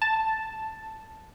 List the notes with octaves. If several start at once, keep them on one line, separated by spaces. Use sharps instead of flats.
A5